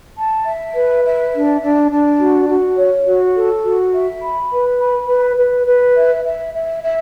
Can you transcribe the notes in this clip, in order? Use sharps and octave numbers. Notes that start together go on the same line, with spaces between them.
A5
E5
B4
E5
D4
D4
D4
F#4
F#4
C#5
F#4
A4
F#4
E5
B5
B4
B5
B4
B4
B4
E5
E5
E5
E5